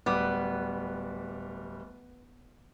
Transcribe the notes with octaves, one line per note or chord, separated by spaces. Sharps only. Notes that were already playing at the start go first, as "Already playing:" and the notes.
D1 G3 B3 D6